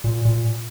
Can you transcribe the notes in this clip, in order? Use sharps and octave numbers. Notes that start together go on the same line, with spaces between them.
A#2
A#2